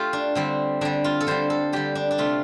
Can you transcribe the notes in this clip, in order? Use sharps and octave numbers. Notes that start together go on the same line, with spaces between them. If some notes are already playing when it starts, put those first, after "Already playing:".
Already playing: A3 F4 G4 A4
D4
D3 G3 C4
D3 G3 D4
F4
A4
D3 G3 C5
A4
D3 G3 G4
D4
D4
C3 A3 F4